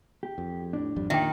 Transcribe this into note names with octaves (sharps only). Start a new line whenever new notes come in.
G4
F2
A2 D4
G#1 F2 G3
A#2 D#3 E5 G5